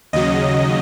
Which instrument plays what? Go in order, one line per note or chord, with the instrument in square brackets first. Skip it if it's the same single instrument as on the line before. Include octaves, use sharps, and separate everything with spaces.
[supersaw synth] D#2 C#3 F#3 D#5